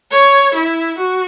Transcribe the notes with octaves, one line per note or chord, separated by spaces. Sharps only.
C#5
E4
F#4